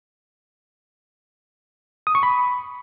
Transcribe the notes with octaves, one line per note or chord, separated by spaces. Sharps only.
D#6
C#6
B5